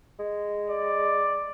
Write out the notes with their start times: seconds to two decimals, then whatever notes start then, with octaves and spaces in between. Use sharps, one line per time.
0.19 G#3
0.69 D5